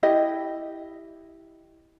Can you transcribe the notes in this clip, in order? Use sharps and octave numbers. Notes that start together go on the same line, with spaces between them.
E4 G4 D#5